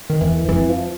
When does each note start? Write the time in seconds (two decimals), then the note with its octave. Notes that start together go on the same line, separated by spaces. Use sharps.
0.10 D#3
0.21 E2 E3
0.49 F2 E3
0.69 F3